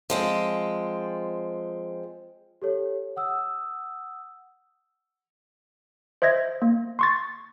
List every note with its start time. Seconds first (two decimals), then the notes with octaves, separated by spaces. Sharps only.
0.10 F3 G#3 C4
2.62 G4 A4 C#5
3.16 F#5 D#6 E6
6.22 C5 D#5 E5 G#6 A#6
6.62 A#3
6.99 C6 C#6 A6